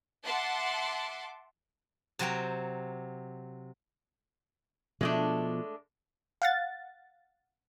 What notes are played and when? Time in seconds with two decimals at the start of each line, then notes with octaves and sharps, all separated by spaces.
0.24 E5 F#5 A5 C6 D6
2.19 C3 F#3 G5 A#5
5.01 B2 F3 G#3 A3 D4
6.42 F5 F#5 A6